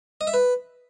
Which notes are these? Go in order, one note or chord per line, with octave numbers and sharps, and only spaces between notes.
D#5
E5
B4